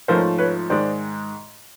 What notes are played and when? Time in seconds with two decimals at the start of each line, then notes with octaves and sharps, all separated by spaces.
0.08 G#2 F3 A3 C#4 A#4 C5
0.38 B4 C#5
0.70 G#2 D#3 G#3 C5 D5